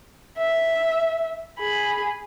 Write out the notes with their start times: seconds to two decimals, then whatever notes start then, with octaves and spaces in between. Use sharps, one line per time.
0.38 E5
1.59 G#4 B5